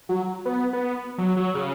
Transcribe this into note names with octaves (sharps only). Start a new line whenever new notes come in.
F#3
B3
B3
F#3
F#3
C#3